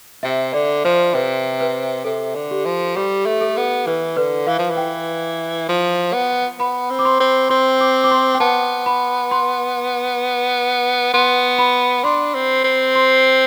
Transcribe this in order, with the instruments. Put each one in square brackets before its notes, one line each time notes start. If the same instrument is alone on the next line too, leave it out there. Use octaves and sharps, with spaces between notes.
[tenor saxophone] C3 [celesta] E5
[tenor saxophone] D3 [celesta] D5
[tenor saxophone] F3 [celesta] C5
[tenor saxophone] C3 [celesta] B4
[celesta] B4
[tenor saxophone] C3 [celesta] A4
[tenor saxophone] D3
[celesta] G4
[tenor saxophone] F3
[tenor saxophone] G3 [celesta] G4
[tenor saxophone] A3
[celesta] A4
[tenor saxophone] B3
[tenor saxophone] E3 [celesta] B4
[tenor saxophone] D3 [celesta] B4
[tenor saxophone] E3 [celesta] F5
[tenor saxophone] F3
E3
[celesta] G5
[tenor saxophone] F3
B3
[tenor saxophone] B3 [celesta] B5
[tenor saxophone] C4
[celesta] D6
C6
[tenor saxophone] C4
[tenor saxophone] C4 [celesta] C6
[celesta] D6
D6
C6
G5
[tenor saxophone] B3 [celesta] A5
[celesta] B5
C6
[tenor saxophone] B3 [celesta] C6
[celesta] B5
[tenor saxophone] D4 [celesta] C6
[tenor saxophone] C4
C4
[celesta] C6